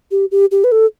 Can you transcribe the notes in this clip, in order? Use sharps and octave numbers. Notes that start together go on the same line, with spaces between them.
G4
G4
G4
B4
A4